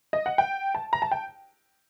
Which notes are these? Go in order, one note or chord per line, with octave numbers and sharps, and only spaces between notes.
D#5
F#5
G5
A5
A#5
A5
G5